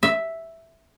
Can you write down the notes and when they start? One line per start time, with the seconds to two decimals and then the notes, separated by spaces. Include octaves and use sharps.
0.03 E5